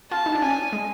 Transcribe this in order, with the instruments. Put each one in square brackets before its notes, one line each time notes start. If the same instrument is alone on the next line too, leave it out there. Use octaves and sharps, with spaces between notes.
[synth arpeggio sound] F4 [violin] A5
[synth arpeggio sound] D#4
D4
[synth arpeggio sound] C#4 [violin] G#5
[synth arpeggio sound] D4
G#3